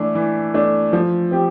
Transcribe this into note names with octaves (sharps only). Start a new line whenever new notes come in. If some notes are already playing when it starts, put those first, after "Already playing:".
Already playing: E3 A3 D4
E3
A3 D4
F3
C4 G4